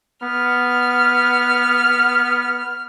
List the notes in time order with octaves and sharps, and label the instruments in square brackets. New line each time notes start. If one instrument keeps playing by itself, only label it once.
[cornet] B3 [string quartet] F6